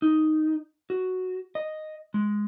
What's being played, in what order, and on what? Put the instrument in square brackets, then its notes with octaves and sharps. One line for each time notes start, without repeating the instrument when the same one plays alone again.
[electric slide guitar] D#4
F#4
D#5
G#3